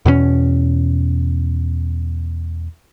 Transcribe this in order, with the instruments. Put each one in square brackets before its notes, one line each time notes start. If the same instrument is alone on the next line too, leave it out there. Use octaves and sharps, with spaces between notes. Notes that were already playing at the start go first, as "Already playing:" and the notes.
[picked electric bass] E2 B2 A3 C#4